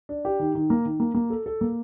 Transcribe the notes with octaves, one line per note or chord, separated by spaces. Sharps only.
D4
G4
D#3
D#3
A#3
D#3
A#3
A#3
A4
A4
A#3